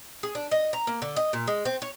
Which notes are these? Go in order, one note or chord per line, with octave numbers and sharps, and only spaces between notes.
G#4
D4
D#5
A#5
A#3
D3
D#5
A#2
G#3
C4
C#5